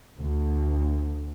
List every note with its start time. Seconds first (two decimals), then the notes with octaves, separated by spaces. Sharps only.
0.21 D2